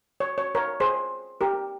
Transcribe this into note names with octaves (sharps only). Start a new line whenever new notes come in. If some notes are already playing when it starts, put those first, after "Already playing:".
C#5
C#5
A#4 C#5
G#4 C5
G4 A#4